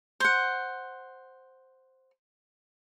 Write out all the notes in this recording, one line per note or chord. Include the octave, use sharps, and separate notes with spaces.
C5 F#5